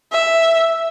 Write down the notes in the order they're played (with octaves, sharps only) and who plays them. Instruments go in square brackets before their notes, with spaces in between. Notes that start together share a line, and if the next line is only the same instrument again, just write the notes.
[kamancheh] E5